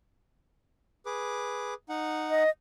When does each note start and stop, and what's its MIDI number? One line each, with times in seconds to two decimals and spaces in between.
1.06 1.74 68
1.06 1.74 71
1.06 1.74 86
1.89 2.43 63
1.89 2.43 78
2.30 2.50 75